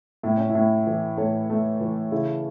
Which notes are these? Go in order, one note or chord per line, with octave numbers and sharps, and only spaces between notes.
A2 E4
C#4
E4
A2
E3
A2 A4 C#5
A3
E3
C#3 E4